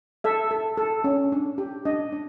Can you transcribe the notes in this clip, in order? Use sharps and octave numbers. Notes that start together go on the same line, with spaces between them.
A4 E5
A4
A4
C#4
D4
G4
D4 D#5
D4